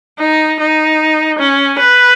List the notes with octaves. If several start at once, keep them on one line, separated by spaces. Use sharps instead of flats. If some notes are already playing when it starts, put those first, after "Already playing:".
D#4
D#4
C#4
B4